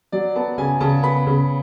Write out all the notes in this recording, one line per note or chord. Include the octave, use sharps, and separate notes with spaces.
F#3 D5
B3 A5
C#3 G#5
C#3 A5
B3 B5
C#3